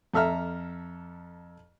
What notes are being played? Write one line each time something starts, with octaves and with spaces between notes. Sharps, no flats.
F2 A4 E5 A#5 F6